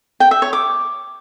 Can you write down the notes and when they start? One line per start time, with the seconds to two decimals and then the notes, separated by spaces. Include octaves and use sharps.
0.20 G5
0.31 E5
0.42 C#5
0.53 D6